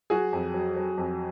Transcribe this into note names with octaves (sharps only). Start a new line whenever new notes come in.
F#3 F#4 G#4
F2
F#3
F#3
F2